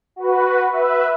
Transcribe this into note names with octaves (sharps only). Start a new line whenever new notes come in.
F#4 B4
B4 E5